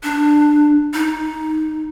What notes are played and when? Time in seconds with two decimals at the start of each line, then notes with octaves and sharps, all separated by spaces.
0.03 D4
0.94 D#4